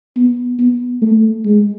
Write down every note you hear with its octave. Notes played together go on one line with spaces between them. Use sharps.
B3
B3
A3
G#3